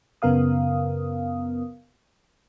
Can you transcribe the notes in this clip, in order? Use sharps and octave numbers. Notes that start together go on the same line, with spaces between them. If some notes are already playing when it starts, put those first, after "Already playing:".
F#2 C#3 B3 A#4 F5 D#6